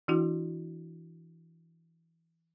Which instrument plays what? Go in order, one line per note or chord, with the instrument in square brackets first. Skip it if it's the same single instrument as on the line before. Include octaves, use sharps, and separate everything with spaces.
[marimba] E3 D4 E4 F#4